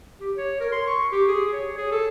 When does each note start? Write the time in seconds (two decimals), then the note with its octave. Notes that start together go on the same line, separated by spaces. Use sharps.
0.20 G4
0.37 C#5
0.60 A#4
0.72 C6
0.87 C#6
1.12 G4
1.28 G#4
1.53 C#5
1.77 G#4
1.92 A4